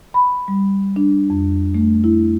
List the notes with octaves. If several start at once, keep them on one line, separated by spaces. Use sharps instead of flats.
B5
G3
D4
F2
A3
E4